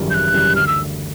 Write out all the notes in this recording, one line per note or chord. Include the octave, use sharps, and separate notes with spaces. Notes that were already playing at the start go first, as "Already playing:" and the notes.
Already playing: G#1 F#2 C#3 E3 G3
G#1 F#6 G6
F#2 C#3 E3 G3
D2 F6
E6